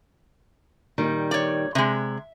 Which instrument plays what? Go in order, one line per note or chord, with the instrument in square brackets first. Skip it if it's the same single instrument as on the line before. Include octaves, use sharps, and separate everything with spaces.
[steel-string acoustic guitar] A#2 D#3 G3
[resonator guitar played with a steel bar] C#5 D5
[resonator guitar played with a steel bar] C3 G#3 [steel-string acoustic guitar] E5